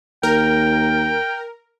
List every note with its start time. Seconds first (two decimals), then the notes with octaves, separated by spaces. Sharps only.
0.23 D#2 A#4 G5